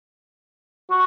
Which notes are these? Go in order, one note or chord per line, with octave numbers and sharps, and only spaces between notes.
F#4